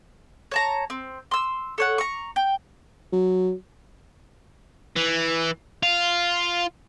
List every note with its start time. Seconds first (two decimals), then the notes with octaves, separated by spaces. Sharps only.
0.51 C#5 A5 A#5
0.90 C4
1.31 C6 E6
1.78 A4 C#5 F#5
1.98 A#5 C#6
2.36 G5
3.12 F#3
4.96 E3
5.83 F4